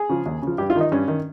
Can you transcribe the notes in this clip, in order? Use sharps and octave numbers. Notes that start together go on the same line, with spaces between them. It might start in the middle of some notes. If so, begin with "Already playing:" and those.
Already playing: G#4
C#3 F3
D#2
C#3 F3
G2 G4
F4
D#3 D#4
G2 C#4
D#3